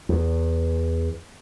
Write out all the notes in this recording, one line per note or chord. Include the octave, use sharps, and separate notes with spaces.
E2